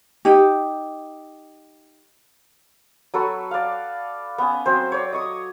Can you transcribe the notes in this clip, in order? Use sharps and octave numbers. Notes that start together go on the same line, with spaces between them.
D#4 G4
F#3 A4 B4 C#6
D5 F5
B3 C#4
F#3 C4 C5
C#5 D5
D#5 C#6 D#6